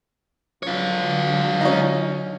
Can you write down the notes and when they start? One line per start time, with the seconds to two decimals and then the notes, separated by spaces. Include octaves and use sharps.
0.63 D3 F#3 F4 C#5
1.61 C#4 D#4